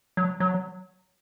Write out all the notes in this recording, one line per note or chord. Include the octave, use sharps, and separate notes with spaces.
F#3
F#3